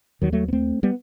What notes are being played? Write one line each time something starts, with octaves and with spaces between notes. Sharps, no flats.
D#2 D#3 F#3
F#3 A3
B3
A3 C4
G3 B3